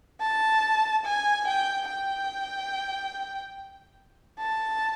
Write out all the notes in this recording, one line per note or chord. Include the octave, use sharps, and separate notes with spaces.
A5
G#5
G5
G5
A5